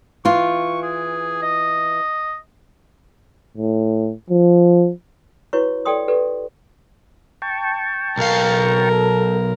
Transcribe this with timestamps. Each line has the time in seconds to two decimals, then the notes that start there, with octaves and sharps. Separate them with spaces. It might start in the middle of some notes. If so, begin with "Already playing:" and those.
0.25 E3 F4 C#6
0.83 G#4
1.42 D#5
3.57 A2
4.30 F3
5.53 E4 F#4 B4 C#5 C#6
5.85 A4 D5 G5 C6 D#6
6.08 G4 A4 B4 D5
7.42 G5 A5 C#6
8.17 B1 A#4 F5
8.91 A4